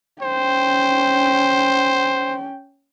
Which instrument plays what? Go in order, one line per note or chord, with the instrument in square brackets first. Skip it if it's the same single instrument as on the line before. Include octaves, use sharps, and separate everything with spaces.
[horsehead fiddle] C#4 G5 [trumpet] C5